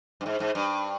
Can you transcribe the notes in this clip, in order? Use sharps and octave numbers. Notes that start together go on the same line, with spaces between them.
G2
G#2
G#2
G2